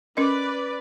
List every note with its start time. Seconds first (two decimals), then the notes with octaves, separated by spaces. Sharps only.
0.17 C#4 A#4 B4 D5 D#5